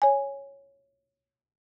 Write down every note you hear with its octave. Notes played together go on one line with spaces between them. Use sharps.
C#5 G#5